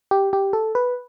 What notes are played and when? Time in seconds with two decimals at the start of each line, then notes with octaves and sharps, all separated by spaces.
0.11 G4
0.33 G4
0.53 A4
0.75 B4